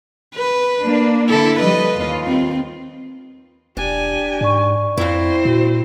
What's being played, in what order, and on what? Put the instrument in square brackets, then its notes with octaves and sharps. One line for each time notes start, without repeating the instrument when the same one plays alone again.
[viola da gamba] B4
[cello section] A#3 D4
[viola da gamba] D3 A4 [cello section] E4
[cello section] F3 G3 [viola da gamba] B4 D#5
[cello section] D#2 F4
[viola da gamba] C4
[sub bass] E1 [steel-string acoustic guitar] D4 [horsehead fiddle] G4 G#5
[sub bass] G#2 [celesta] D5 C#6
[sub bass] F2 [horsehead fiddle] C4 C5 [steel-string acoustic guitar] E4 F5
[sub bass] A#2 [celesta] F#4